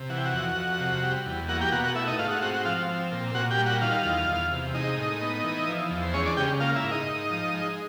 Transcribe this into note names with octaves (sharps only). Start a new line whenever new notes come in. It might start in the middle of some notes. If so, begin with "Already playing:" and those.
Already playing: C3
E3 F#5
G5
F#4 F#5
F2
F2
C3
G3
E2
A#3 F#4 F#5
G4 G5
B2 F#4 F#5
F#4 F#5
A3 E4 E5
D#4 D#5
G#2 F4 F5
F#4 F#5
C4 F#4 F#5
F#4 F#5
F3 F4 F5
C4
A#2
A#2 F#4 F#5
G4 G5
G3
F#4 F#5
D#3 F4 F5
E2
E2
C3
G#3 D#4 D#5
A2
B3
E3
F3
E2
C5
G#3 C#4 C#5
D4 D5
C#3 G4 G5
A#3 F4 F5
E4 E5
G#2
D#4 D#5
G#2
F3
G#3